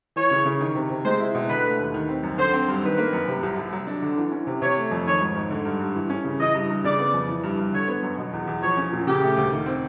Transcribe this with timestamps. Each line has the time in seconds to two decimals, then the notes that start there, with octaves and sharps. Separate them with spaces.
0.16 E3 C#5
0.31 C#3
0.45 C#3
0.60 D#3
0.75 C3
0.90 C3
1.05 G#3 C5
1.20 E4
1.35 B2
1.49 D3 B4
1.64 A3
1.79 D#2
1.94 D#3
2.09 C4
2.23 F#2
2.38 D3 C5
2.53 C4
2.68 G2
2.83 D#3 B4
2.98 A#3
3.13 F#2
3.28 C3
3.43 C2
3.57 C2
3.73 F#3
3.87 D4
4.02 D3
4.17 E3
4.32 C#4
4.47 C3
4.61 C3 C#5
4.77 A3
4.91 F2
5.06 D#3 C#5
5.21 G#2
5.35 G#2
5.51 D3
5.65 G2
5.81 G2
5.95 E3
6.10 C#4
6.25 C#3
6.40 E3 D#5
6.55 G2
6.70 G2
6.84 C#3 D5
6.99 B3
7.14 F2
7.29 E3
7.44 G2
7.58 G2
7.73 D3 C#5
7.88 B3
8.03 F#2
8.18 B2
8.33 E2
8.47 E2
8.62 F3 C#5
8.77 C#4
8.92 A#2
9.07 C#3 G4
9.22 A3
9.37 D2
9.52 D#3
9.66 C4